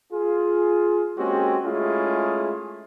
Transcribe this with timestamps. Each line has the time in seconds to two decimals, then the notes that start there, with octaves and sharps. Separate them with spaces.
0.13 F4 G#4
1.18 G#3 A#3 C4 C#4 F#4 G4
1.66 G#3 A3 C#4 E4 F4 G#4